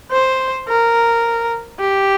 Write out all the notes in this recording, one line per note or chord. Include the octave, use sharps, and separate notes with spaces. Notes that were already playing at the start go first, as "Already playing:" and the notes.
C5
A#4
G4